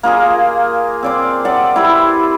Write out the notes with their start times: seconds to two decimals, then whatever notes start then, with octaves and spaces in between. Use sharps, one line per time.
0.03 A#3 F4 G#4 D#5
1.03 C4 D5 C6
1.45 D5 E5 F#5
1.76 E4 G4 B4 C5